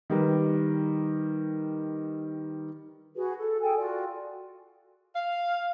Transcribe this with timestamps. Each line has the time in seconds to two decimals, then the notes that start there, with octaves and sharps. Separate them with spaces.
0.10 D#3 G3 A#4 B4
3.16 F#4 G#4 B4
3.40 A4
3.61 G#4 A4 G5 G#5
3.78 F4 F#4 D5
5.15 F5